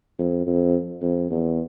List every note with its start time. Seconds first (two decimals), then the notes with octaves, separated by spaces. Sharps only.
0.19 F2
0.46 F2
1.02 F2
1.31 E2